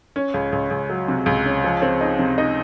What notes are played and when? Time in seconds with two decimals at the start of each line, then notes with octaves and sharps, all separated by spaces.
0.16 C#4
0.34 C#2
0.52 C#2
0.71 C#2
0.90 F#3
1.08 C3
1.26 C#2
1.45 C#4
1.64 F3
1.82 C4
2.01 D#4
2.19 C3
2.38 D#4